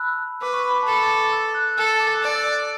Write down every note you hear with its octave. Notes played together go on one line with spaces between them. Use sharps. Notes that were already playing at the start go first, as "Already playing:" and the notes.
Already playing: A5 B5 E6 F#6
B4 D6
C#6
B5
D6
C#6
A5
A4 B5
D6
D6
E6
F#6
F#6
A4 E6
D6
F#6
D5 E6
E6
F#6